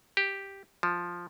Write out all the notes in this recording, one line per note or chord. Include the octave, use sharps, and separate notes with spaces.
G4
F3